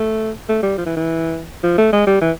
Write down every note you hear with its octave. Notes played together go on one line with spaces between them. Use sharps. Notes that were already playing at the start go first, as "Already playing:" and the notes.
Already playing: A3
A3
G3
F3
E3
E3
F3
A3
G#3
G3
E3